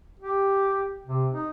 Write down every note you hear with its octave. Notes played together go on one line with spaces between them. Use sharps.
G4
C3
D#4